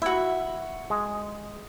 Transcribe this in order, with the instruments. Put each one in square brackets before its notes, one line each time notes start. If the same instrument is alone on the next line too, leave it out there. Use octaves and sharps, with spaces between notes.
[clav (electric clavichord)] E4 [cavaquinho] F#4 E5
[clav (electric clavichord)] G#3